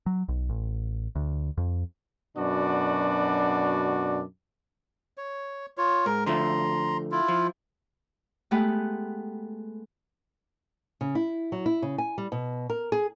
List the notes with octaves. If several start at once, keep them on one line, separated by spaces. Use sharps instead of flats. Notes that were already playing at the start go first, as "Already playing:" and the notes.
F#3
B1
A1
D2
F2
F#2 B2 D4 F#4 D5
C#5
F4 C#5
G#2 A#4
D3 F3 A3 A#5 C6
E4 F4
F3
G#3 A3 B3 G4 B4 F#5
C#3
E4
F#3
E4
C#3
G#5
G3
B2
A#4
G#4